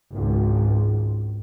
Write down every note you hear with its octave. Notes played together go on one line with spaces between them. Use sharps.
G#1 C#2